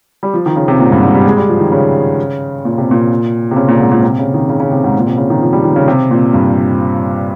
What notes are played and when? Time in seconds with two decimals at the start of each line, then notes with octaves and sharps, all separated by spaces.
0.23 G3
0.34 F3
0.46 D#3
0.56 C#3
0.68 C3
0.80 A#2
0.86 G#2
0.92 G2
1.03 G#2
1.14 G3
1.25 G#3
1.37 G3
1.49 F3
1.60 D#3
1.72 C#3
2.65 A#2
2.78 C3
2.91 A#2
3.51 C3
3.56 C#3
3.69 A#2
3.80 G#2
3.92 A#2
4.03 C3
4.19 C#3
4.34 D#3
4.49 C#3
4.60 C#3
4.72 C3
4.84 G#2
4.98 A#2
5.07 C3
5.17 C#3
5.30 D#3
5.42 F3
5.53 G3
5.64 D#3
5.76 C#3
5.88 C3
6.11 A#2
6.34 G2